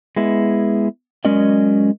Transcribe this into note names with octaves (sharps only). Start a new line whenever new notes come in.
G#3 B3 E4
F#3 G#3 C#4 A#4 D5 D#5